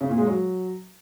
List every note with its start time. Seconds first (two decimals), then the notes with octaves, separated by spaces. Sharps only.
0.01 C#3
0.09 A#2
0.18 G#3
0.26 F#3